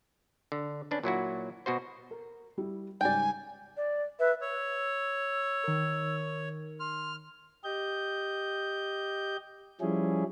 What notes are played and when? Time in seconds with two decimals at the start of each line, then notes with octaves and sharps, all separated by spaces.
0.52 D3
0.91 C#4 D4 B4
1.03 A#2 F#3 E4 F#4
1.66 B2 F#4 C5
2.11 A#4
2.58 G3 E4 G4
3.01 G#2 C#3 G3 D5 G5 G#5
3.77 D5
4.20 B4 E5
4.41 C#5 E6
5.64 D#3 A#4
6.80 C6 F6
7.64 G4 D#5 G6
9.81 F3 G3 C#4 E4 G#4